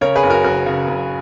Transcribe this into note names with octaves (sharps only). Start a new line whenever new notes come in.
C#3 A#4 C#5
G#4 B4
F#1
F#4 A#4
F#1 F#4 A#4
C#3
F#1